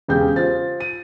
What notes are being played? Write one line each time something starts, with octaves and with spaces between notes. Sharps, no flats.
E1 C#3 G4 G6
F4 C5 A6
D#7